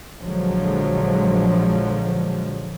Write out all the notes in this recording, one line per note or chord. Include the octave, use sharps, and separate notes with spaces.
A#1 D3 F3 F#3 G#3